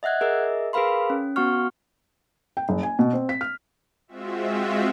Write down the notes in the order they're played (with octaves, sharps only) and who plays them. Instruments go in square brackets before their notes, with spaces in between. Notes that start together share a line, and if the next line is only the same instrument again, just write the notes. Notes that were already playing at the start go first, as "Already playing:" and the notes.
[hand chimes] D#5 E5 F#5 F#6 G#6
G#4 A#4 D#5 E5
G#4 A#4 B4 F5 B5 C6
C#4
B3 F#4 F#5 C#6 F6
[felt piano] G5
F#1
G#5
B2
C4
B6
F6
[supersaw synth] G#3 C4 F4 F#4 E5